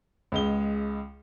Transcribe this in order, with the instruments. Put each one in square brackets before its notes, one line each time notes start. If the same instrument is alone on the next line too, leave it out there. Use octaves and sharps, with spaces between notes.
[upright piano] C#2 G#3 G7